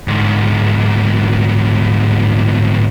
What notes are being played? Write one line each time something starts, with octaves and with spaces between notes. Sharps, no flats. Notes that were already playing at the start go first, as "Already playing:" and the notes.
D2 G#2